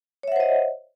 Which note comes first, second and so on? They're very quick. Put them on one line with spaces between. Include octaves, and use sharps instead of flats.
C#5 E5 F#5 C5 D#5